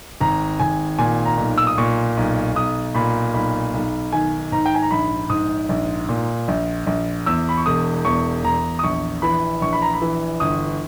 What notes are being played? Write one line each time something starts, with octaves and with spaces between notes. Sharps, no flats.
G#1 A#5
G#1 G#5
A#2 G#5
A#5
B1
E6
D#6
A#2 C#6
B1
B1 D#6
A#2 B5
B1 B5
B1
D#3 G#5
G#2 A#5
G5
G#5
A#5
A#1 B5
G#2 D#6
A#1
A#2
A#1
A#1
E2 E6
B5
C#6
E1 D#6
E2 C#6
E2 A#5
D#6
A#1 C#6
E3 B5
A#1 C#6
B5
A#5
B5
E3
G1 D#6